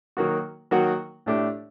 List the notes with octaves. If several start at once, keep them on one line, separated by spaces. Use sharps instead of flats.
D#3 F#3 A#3 F#4
D#3 F#3 A#3 F#4
A2 A3 D4 G4